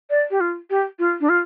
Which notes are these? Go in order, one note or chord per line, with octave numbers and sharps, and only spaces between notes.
D5
G4
F4
G4
F4
D4
F4